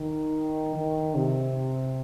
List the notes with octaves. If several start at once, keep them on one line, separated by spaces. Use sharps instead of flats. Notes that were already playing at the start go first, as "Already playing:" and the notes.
Already playing: D#3
D#3
C3